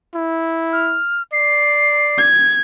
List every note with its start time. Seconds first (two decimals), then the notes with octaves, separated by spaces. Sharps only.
0.15 E4
0.73 F6
1.32 D5 C7
2.18 G#6